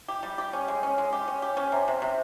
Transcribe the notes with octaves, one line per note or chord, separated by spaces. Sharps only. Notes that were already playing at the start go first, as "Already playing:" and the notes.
G4
G3
G4
C#4
G#3
C#4
G#3
G4
C#4
G4
C#4
C3
C3
C3